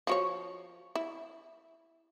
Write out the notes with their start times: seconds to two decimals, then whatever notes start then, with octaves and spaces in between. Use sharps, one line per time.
0.07 F3 F#4 C#5
0.95 E4